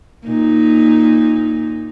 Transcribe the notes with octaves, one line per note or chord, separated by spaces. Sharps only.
A#2 D#4